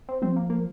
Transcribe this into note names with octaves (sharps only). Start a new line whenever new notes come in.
C4
F3 C4
A#3
A#3